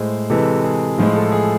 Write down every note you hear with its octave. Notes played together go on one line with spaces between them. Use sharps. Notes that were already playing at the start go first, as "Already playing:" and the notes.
Already playing: A2 G#3 C5
C3 E3 G#3 A4
G#4
A2 F3 G#3 F4
A4
G#4